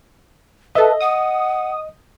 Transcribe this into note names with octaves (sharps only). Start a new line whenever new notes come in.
A4 B4 D#5 E5
F#5 D#6